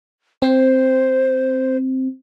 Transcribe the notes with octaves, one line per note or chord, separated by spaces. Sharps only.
C4 C5